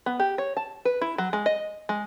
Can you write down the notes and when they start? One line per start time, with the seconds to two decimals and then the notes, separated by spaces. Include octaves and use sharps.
0.06 B3
0.20 G4
0.38 C#5
0.57 A5
0.85 B4
1.01 E4
1.18 F#3
1.33 G#3
1.46 D#5
1.89 G#3